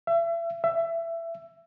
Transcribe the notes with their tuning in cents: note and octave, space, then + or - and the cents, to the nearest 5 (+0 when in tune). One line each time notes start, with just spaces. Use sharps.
E5 +35
E5 +20